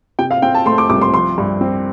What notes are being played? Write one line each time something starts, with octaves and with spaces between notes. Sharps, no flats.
C3 G5
F5
C4 G5
A5
A3 C6
D6
C2 D6
C6
F3 C6
G2
C4